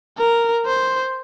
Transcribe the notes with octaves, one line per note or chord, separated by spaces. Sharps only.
A#4
C5